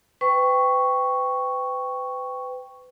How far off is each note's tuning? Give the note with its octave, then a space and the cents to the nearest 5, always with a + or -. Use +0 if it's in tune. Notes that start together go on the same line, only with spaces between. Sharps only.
B4 +35 G5 +0 C#6 +0